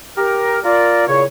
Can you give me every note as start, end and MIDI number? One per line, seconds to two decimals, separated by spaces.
0.17 0.59 67
0.17 0.59 70
0.64 1.04 65
0.64 1.04 70
0.64 1.04 74
1.07 1.24 46
1.07 1.24 49
1.07 1.24 64
1.07 1.24 73